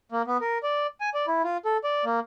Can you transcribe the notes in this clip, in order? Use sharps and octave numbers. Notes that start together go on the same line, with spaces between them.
A#3
B3
A#4
D5
G#5
D5
E4
F4
A4
D5
A#3